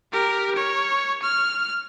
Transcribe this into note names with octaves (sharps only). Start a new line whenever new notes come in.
G4 A#4
C#5
F6